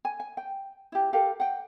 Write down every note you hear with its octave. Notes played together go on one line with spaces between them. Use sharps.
G#5
G#5
G5
E4 G4
G4 A4 A#4 F5
F#5 G5